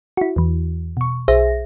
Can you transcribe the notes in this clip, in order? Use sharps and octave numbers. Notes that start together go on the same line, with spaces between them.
E4 F#4
E2 E3
B2 C#6
B1 G#4 C5 E5 A#6